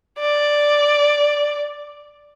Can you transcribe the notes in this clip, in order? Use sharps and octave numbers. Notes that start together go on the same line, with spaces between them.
D5